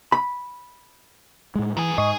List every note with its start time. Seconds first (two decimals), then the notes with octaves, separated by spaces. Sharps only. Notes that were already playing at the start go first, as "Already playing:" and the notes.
0.12 B5
1.55 A2 G#3
1.77 F#2 E3 G#4
1.98 G#2 G#4 D#5 G#5 C#6 D#6